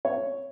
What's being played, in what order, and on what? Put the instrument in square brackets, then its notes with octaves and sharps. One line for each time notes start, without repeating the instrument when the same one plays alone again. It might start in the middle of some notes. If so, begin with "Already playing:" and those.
[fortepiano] C#5